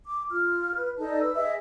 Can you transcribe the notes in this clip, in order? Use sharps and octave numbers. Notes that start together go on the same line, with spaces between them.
D6
F4 F6
B4
D#4 A4 D5 A5
B4 E6
G#4 D#5 E5